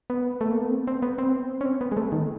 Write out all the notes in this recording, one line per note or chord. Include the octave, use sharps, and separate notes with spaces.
B3
A3
A#3
B3
C4
C4
B3
C4
C#4
C4
B3
G#3
A3
D#3